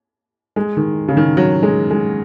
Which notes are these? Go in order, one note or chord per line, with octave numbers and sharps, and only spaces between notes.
G#3
D#3
C#3
D#3
F#3
G#3
G#3